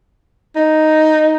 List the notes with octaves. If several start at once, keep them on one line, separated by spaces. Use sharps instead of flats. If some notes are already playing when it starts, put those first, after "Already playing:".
D#4